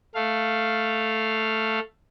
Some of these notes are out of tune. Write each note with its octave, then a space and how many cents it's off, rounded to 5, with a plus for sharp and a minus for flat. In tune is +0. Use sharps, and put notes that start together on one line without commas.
A3 +0 F5 -5